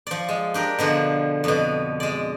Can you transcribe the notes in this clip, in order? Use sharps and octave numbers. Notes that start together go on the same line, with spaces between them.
F3 D5
G#3
D4 G4 A#4
B2 D3 F3
F2 B2
G#3 D5